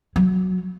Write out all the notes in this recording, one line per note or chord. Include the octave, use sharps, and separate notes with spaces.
F#3